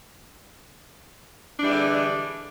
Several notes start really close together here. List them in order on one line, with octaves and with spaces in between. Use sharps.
D4 E3 G3 G#3 D3